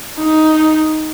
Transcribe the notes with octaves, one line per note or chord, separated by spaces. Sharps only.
D#4